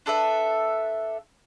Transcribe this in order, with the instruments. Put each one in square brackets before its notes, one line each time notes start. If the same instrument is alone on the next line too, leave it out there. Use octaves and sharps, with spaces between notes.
[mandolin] D4 A4 B4 E5